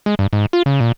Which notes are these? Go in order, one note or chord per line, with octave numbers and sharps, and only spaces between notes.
G#3
G2
G#2
F4
C#3
A#2